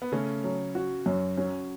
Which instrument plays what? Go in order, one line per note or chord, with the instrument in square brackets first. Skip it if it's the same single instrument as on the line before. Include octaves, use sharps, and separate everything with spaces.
[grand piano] B3
[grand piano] C#3 C#4 [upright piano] A3
[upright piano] F#3
F#4
F#2
[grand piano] F#3 [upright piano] C#4